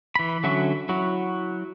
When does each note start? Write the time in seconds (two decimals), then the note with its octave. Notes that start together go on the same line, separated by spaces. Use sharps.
0.15 E3 B5
0.44 D3 F#3 C#4 F#4 E5
0.89 F#3 E4 F#4